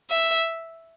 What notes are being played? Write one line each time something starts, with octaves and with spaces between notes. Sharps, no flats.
E5